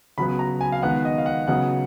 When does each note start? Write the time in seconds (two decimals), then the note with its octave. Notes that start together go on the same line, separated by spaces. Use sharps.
0.18 C#3 F#3 B3 B5
0.39 A#5
0.61 G#5
0.72 F5
0.82 D#3 G#3 B3 F#5
1.05 D#5
1.18 F5
1.26 F#5
1.47 C#3 F#3 B3 F#5